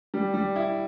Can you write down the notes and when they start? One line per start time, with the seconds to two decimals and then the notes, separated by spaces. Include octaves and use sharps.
0.14 G3
0.34 G3
0.56 E4